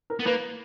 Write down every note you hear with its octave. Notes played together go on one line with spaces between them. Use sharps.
A#4
B3
A#3 B4